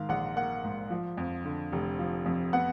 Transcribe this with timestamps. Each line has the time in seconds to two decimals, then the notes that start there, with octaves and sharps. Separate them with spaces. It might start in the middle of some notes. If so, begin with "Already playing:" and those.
Already playing: G#2 D#3 F5
0.09 A#1 F#5
0.36 A#3 F#5
0.64 G#2
0.90 F3
1.18 F2
1.45 D3
1.72 F1
1.99 F3
2.26 F2
2.53 B3 F#5